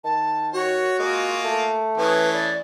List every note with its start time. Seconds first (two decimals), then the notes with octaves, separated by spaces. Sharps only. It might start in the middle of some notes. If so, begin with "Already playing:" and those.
0.04 D#3 A5
0.53 F#4 C#5
0.99 G#3 A#3 F4 G#4
1.44 A3
1.98 E3 C#4 G#4 B4
2.33 D5